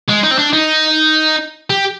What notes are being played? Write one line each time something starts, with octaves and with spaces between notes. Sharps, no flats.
G#3
D#4
C4
D4
D#4
G4